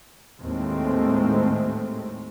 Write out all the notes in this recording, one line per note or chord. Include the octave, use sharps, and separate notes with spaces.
D#2 A2 G#3 A3 C4